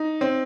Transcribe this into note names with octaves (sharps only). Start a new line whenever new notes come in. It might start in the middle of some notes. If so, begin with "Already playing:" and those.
Already playing: D#4
C4